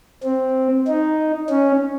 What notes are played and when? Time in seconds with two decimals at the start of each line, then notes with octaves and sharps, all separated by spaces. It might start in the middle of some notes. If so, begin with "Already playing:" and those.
0.23 C4
0.87 D#4
1.50 C#4